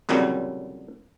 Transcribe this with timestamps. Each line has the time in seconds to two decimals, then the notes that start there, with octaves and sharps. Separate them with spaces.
0.09 C2 F2 A#2 C#3 F#3 G3